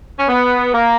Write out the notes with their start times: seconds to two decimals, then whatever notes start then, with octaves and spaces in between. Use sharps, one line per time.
0.19 C#4
0.28 B3
0.74 A#3